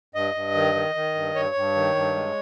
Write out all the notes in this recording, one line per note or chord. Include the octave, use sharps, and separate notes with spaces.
G2 D#5
G2
D#3
D#3
D#3
G2
G2 C#5
G2
D#3
G2
G#3